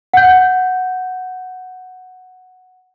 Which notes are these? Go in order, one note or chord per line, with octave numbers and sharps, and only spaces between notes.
F#5 G6